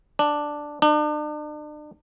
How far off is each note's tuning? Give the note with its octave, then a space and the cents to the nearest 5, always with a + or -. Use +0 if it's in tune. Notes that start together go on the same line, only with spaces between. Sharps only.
D4 +5
D4 +40